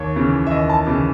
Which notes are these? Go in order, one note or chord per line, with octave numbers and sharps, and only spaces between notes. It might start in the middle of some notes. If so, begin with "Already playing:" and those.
Already playing: D#2 C#5
C#3 E3
E5
D#2 D#5
A5
C#3 E3